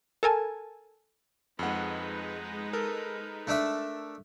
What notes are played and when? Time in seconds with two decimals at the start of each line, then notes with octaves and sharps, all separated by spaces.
0.23 A4 A#4 G#5 A5
1.59 F2 G#3 D#4 B4 F#5
2.73 A4 A#4
3.47 A3 D4 E5